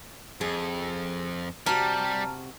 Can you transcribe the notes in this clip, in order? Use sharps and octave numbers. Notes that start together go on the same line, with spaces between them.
F2 G#4
C3 G3 F#4 A5 A#5 F6